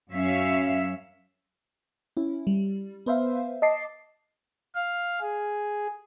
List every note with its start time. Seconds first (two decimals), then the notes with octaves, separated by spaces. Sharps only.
0.12 F#2 C#4 E5 F5
2.17 C#4 E4
2.47 G3
3.06 B3 B4 C5 E5 F5
3.62 D#5 A5 D6 C7
4.75 F5
5.21 G#4